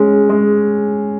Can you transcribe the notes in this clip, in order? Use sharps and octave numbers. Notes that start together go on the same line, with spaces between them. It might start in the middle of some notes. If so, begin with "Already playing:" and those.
Already playing: G#3 C#4
G#3